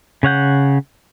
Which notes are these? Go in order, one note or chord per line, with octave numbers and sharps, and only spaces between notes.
C#3 C#5 F#5 G6